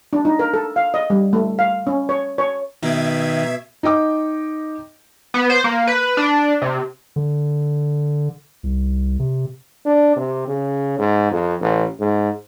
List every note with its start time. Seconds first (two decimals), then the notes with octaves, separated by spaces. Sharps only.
0.13 D4
0.25 D#4
0.39 A#4
0.54 A4
0.76 F5
0.94 D#5
1.10 G3
1.33 A3
1.59 F5
1.87 C#4
2.09 C#5
2.38 C#5
2.83 B2 D#3 E5 G#6
3.83 D#4 D#5 G5 D6
5.34 B3
5.50 C5
5.64 A#3
5.87 B4
6.17 D4
6.62 C3
7.16 D3
8.63 C2
9.19 C3
9.86 D4
10.16 C3
10.47 C#3
10.99 G#2
11.31 F2
11.61 A1
12.00 G#2